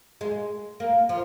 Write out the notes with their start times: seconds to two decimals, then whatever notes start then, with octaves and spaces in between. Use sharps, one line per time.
0.21 G#3
0.80 A#3
1.09 F3